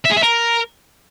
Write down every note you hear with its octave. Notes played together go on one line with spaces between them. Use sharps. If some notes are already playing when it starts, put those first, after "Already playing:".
E5
G#4
E5
A#4